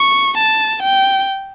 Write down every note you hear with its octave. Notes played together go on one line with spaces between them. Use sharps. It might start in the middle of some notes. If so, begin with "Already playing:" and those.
Already playing: C#6
A5
G5